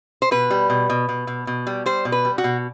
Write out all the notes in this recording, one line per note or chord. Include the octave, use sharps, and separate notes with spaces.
C5
B2 B4
G3
B2
B2
B2
B2
B2
G3
G3 C5
B2
B4
G3
F#4
B2